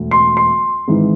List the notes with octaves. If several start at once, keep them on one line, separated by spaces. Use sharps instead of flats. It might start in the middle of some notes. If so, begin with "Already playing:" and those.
Already playing: E1 D2 A3
C6
C6
G#1 G#2 E3